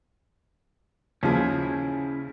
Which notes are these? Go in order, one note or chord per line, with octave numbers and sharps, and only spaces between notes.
D#2 C#3 F3 C#4 E4 G#4